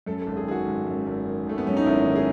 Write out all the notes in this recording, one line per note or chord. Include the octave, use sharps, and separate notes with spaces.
F#2 A4
A4
G#1
G#4
D#3 F#4 G#4
G#1
F#2
G#1
D#3
G#1 A3
B3
F#2 C#4
D#4
G#1 E4
D#3
G#4